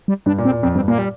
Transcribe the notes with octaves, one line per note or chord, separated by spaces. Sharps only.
G3
G2 D4
A#2
C4
A#2
F2 C4
G2 C4
A#2 A#3
G3